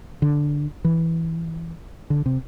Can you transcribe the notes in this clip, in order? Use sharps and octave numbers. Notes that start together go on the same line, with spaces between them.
D3
E3
D3
C3